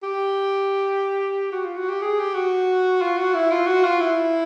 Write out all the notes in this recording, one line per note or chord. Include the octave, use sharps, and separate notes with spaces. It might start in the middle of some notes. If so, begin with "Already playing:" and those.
G4
F#4
F4
F#4
G4
G#4
G4
F#4
F4
F#4
E4
F4
F#4
F4
E4